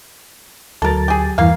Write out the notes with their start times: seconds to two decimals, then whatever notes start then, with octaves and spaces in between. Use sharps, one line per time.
0.82 D2 F#3 A4 A#4 A6
1.08 G4 G#4
1.38 E2 G2 E3 A#3 F5